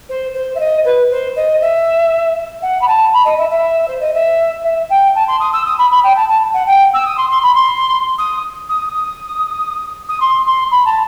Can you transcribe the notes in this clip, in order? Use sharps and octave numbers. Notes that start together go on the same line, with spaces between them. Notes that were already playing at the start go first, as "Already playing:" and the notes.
C5
C5
E5
D#5
B4
C5
D#5
E5
F#5
B5
A5
B5
D#5
E5
E5
C5
D#5
E5
E5
G5
A5
C6
D#6
E6
D#6
B5
B5
G5
A5
A5
F#5
G5
E6
D#6
C6
C6
B5
C6
D#6
D#6
D#6
D#6
C6
C6
B5
A5